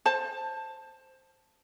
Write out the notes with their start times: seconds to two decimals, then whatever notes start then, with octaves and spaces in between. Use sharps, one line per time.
0.05 C5 A5